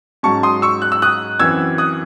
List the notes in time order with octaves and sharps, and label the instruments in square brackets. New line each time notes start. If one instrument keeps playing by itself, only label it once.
[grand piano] G#2 F#3 C#4 A5 C#6
C6 D#6
C#6 E6
F#6
E6
D#6 F#6
F#2 E3 C4 E6 G#6
D#6 F#6